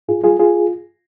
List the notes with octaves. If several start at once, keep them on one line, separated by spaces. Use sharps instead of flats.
G#2 F4 G#4
G3 F4 G#4
F4 G#4